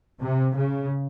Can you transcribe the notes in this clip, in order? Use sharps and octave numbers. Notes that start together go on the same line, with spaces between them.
C3
C#3